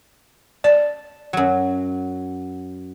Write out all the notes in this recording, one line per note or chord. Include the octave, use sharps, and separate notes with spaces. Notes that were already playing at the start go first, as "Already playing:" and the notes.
D5 A5
F#2 F#3